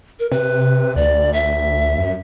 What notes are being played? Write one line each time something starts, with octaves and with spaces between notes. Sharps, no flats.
A#4
C3 B4
D2 D5
E5
F#2